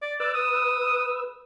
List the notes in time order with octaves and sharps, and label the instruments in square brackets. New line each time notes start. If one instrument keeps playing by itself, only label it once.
[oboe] D5
[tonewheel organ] B4 E6 [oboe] D5
[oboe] D#6